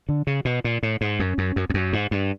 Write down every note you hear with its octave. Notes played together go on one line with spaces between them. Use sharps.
D3
C#3
B2
A#2
A2
G#2
F#2
F#2
F#2
F2
F#2
G#2
G2